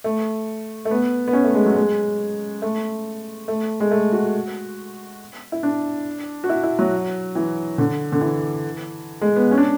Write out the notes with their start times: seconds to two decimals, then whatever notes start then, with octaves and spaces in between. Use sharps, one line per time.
0.04 A3
0.85 A3
0.91 B3
1.28 B3
1.33 C#4
1.44 A3
1.55 G#3
1.66 F#3
1.76 G#3
2.62 A3
3.48 A3
3.80 G#3
3.91 A3
4.12 F#4
5.52 E4
5.63 D4
6.44 F#4
6.49 E4
6.63 E4
6.79 F#3
7.35 E3
7.78 D3
8.12 D3
8.21 E3
9.22 G#3
9.36 B3
9.51 C#4
9.58 D4